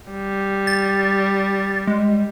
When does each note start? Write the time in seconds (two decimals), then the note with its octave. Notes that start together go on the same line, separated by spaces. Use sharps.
0.11 G3
0.67 A6
1.87 G#3